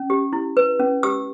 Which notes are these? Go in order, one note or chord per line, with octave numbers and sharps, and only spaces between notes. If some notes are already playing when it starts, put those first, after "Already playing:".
Already playing: C#4
G4
E4
B4
C#4
G4 E6